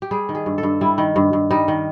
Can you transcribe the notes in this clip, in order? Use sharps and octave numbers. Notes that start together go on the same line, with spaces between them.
G4
G3 G#4
D#3
G#4
G2
A4
G2
G3 E4
D#3
G2
G2
G3 D#4
D#3